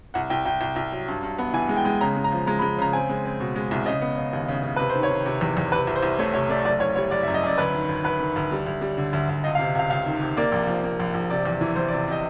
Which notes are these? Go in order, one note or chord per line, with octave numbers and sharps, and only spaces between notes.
C2 F#5
C2 G5
C2 G5
C2 G5
C2
F#3
G2
G2
B3
E3 G#5
G#3
G5
G#3
C#3 A#5
G#3
A#5
F3
G#3 A#5
B5
G#3
C#3 A#5
C4 G#5
G#3
C4
B2
G#3
C2
C#3 D#5
B3
C#3
D#2
C#3
C#3
C3 B4
C5
D#3
C#5
D#3
C3
E2
E2
C3 B4
C2
C5
C2
A3 C#5
C3 C#5
A3 D5
F#1 D5
F#1 C#5
G3 C#5
F#1 D5
E5
F#2
D#5
F#2 D5
D2 B4
D#3
D2
D2 B4
D#3
D2
G3
D2
G3
D3
D2
D2
C#2 D#5
F5
C3
C#2 F5
C#2 F5
D#3
C3
A#3 D5
A#1
F3
A#3
A#1
A#1
C3 D5
E2
E3
E2 C5
D5
C3
C3 D#5